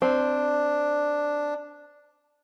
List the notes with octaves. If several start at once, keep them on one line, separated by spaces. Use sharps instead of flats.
C4 D4